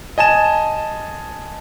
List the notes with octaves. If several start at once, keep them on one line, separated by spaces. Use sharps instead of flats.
D#5 G#5 A5 E7